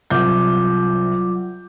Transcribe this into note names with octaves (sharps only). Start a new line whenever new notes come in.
C2 F#3 F4 D6 G6